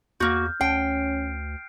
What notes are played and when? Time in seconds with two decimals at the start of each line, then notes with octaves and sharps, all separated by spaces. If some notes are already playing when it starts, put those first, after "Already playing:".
0.20 E2 A#3 F#4 F6 G6
0.61 D2 C#4 G5 C7 D7